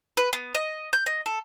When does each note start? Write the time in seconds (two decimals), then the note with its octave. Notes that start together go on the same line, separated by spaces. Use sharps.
0.17 B4
0.33 B3
0.55 D#5
0.93 G6
1.06 D#5
1.26 A4